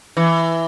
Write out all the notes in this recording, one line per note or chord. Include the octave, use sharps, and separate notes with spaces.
E3